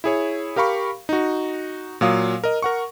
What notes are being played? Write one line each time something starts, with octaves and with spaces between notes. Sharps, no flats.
E4 G#4 C#5
G4 A#4 F5 B5 C#6
D#4 F#4
A#2 F#3 F5 D#6
A#4 D#5
A#4 F#5 C#6